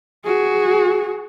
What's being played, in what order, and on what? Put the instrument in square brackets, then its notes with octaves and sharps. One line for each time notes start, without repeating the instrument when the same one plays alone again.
[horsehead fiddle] F#4 G#4